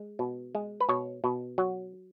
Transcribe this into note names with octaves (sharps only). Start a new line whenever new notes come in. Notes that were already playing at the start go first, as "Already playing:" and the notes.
Already playing: G#3
B2
G#3
B4
B2 C#5
B2
F#3